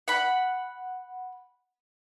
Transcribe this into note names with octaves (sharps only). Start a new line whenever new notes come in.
F#5 B5